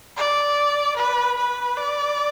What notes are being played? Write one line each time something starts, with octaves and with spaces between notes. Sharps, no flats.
D5
B4
B4
D5